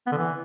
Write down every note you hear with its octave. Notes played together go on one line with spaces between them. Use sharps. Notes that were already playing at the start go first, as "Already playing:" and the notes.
B3
D3
E3